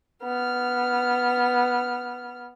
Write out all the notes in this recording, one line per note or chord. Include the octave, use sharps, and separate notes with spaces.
B3 F6